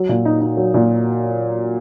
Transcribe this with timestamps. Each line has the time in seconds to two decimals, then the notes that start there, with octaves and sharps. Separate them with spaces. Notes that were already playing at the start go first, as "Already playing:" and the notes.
Already playing: F#3
0.09 A#2
0.25 D#4
0.41 D#4
0.57 F#3
0.74 A#2